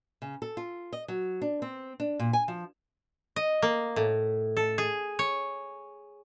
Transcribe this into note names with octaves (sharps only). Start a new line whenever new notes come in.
C#3
A4
F4
D#5
F#3
D4
C4
D4
A#2
G#5
F3
D#5
A#3
A2
A4
G#4
C#5